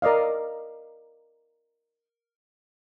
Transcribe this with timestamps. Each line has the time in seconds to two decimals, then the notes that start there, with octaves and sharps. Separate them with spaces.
0.02 A#4 D5 D#5 F5